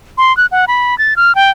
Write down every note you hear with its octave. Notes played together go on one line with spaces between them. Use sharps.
C6
F#6
F#5
B5
A6
F6
G5